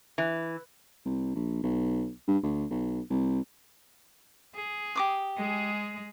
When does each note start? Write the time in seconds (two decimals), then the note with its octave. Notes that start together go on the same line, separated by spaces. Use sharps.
0.18 E3
1.05 C2
1.35 A#1
1.63 B1
2.28 G2
2.43 D2
2.70 B1
3.10 C2
4.55 G#4
4.95 G4 D6 D#6
5.38 G#3 G#4